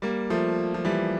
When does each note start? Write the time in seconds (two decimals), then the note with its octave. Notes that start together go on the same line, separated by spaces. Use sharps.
0.02 G3 A#3
0.30 F3 A3
0.74 F3
0.85 E3 G3